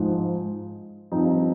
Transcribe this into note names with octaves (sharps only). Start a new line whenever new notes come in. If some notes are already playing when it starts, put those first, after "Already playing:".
Already playing: G#2 F3 G#3
G2 F3 C4 D#4